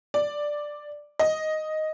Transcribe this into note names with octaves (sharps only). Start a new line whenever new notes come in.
D5
D#5